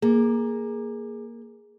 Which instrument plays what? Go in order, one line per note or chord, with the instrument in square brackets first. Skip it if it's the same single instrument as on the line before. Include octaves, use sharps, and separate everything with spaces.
[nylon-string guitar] A#3 [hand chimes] G#4